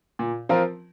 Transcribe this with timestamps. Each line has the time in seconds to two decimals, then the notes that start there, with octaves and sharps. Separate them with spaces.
0.19 A#2
0.49 F3 C4 F4 A#4